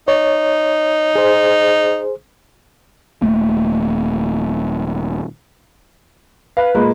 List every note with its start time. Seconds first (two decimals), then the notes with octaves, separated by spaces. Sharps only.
0.08 D#4 C#5
1.15 G#4 C5
3.22 D#1 F2 A3 A#3
6.57 B4 F5
6.75 A#2 G#3 A#3